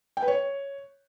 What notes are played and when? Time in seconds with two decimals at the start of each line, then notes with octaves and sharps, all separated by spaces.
0.17 G5
0.22 B4
0.28 C#5